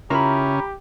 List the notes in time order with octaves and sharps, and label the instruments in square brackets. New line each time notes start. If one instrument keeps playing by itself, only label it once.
[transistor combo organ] C#3 C#4 [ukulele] E4 F4 A#4 [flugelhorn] G4 [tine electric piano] A#5 B5